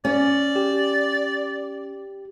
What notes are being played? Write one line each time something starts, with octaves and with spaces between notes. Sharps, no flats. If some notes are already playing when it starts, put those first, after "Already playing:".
C#4 D5
G4